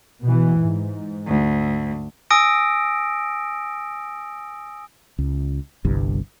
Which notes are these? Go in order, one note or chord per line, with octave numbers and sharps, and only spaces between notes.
B2 E3
G#2
D2
G#5 D#6 E6 A#6 D7
C#2
G1 C2 G2